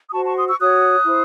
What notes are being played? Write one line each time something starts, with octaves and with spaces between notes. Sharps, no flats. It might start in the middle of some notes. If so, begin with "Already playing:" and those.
D#6
F#4 C5 A5 C#6
A5 C#6
C6 D#6
C#6 E6
F#4 C#5 D#6 F#6
E4 C5